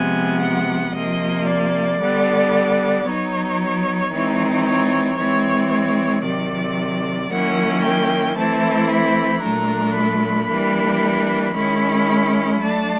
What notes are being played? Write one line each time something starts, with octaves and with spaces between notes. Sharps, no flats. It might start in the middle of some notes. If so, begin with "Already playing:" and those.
Already playing: C3 F3 G#3 B3 G#5
F#5
C3 F3 A#3 D#5
D5
D3 G3 B3
F#3 B3 D#4 C#5
E3 G#3 C4 D#4
C#5
E3 G#3 C4 C#5
C#5
C3 D#3 F#3 D5
D#3 F#3 A#3 C#4 E4 F#5
G5
E3 A3 C4 E4 A5
B5
A#2 F#3 A3 D4 A#5
B5
E3 G3 A#3 D4
D#3 G#3 C#4 E4 B5
F#3 A3 D4 A5